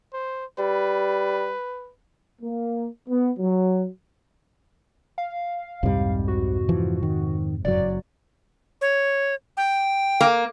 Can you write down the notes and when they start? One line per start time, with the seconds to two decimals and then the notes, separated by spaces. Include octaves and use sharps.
0.13 C5
0.59 G3 B4
2.41 A#3
3.08 B3
3.39 F#3
5.18 F5
5.83 C2 F2 G#2 C3 G3
6.28 F#4
6.69 E3 F3
7.03 D#3
7.65 F#1 F#3 D5
8.81 C#5
9.57 G5
10.21 A#3